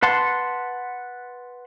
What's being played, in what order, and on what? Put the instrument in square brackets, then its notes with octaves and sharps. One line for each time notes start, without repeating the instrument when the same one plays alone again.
[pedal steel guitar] B4 F#5 A5 C6